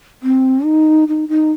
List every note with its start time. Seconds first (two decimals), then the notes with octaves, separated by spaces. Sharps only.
0.23 C4
0.65 D#4
1.08 D#4
1.29 D#4